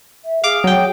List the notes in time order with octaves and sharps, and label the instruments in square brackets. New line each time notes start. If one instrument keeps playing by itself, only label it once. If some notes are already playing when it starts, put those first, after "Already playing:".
[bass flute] E5
[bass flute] G#4 [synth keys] F5 D6
[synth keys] F#3 G5